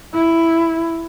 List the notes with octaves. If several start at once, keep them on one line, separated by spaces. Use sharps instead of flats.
E4